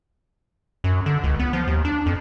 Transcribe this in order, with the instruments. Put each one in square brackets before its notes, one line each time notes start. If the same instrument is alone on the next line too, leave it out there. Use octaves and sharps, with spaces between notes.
[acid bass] F#2
D3
C#2
B3
F3
D#2
D4
F2